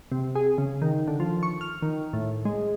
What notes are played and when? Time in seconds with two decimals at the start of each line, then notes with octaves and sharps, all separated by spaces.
0.11 C3
0.35 G#4
0.58 C#3
0.82 D#3
1.08 D3
1.20 F3
1.43 C#6
1.61 F6
1.82 D#3
2.13 A2
2.45 G#3